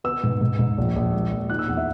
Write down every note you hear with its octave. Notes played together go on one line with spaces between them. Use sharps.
B3 E6
G#2
G#2
G#2
A#1
A#1
G#3
A#1
D#4 F#6
E6
E2 F#5
E5